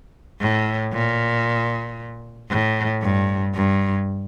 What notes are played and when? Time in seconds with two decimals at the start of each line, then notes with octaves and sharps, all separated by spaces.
0.40 A2
0.93 A#2
2.49 A2
3.02 G2
3.55 G2